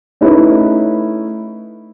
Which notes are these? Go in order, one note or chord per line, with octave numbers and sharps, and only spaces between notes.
A3 C#4 D#4 E4 B4